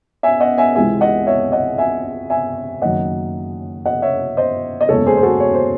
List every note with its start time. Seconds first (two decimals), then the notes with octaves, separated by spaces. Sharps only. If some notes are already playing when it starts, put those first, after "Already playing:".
0.23 E5 G#5
0.40 D#5 F#5
0.58 E5 G#5
0.75 C#2 C3 E3 G#3 C4 E5 G#5
1.01 D#5 F#5
1.27 C#5 E5
1.52 D#5 F#5
1.78 E5 G#5
2.30 E5 G#5
2.82 F#1 F#2 D#3 F#3 D#5 F#5
3.85 D#5 F#5
4.02 C#5 E5
4.37 C5 D#5
4.81 D#5
4.89 F#1 E2 C#3 G#3 A4 C#5
5.06 G#4 C5
5.17 C5
5.23 F#4 A4
5.40 C#5
5.54 C5